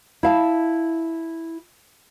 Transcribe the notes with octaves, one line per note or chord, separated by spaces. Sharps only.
E4 F5 A5